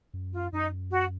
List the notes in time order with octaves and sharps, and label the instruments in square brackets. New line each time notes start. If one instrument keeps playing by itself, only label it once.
[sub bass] F#2
[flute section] F4
[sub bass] F#2 [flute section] D#4
[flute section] F#4